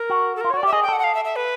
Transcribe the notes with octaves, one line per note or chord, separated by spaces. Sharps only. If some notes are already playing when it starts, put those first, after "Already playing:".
Already playing: A#4
F#4
A4
F4 A#4
C#5
F#4 D5
G4 E5
G#4 D#5
G5
A4 F#5
F#5
F5
E5
E5
B4